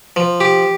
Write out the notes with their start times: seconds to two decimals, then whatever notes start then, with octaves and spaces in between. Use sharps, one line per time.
0.16 F3
0.40 G4